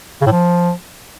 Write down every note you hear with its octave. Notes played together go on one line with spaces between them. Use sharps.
C#3
A2
F3